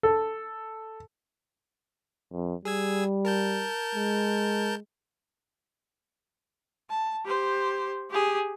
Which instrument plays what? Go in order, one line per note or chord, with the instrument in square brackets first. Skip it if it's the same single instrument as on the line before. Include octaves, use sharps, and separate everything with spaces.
[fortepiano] A4
[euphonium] F2
[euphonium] G3 [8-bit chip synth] G#4 E6 G#6
[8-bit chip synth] A#4 A5 G6
[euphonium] G#3
[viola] A5
G4 C5
G4 G#4